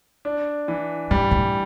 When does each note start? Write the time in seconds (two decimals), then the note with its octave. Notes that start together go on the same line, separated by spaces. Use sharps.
0.25 D4
0.68 E3
1.11 A2 G3
1.31 A2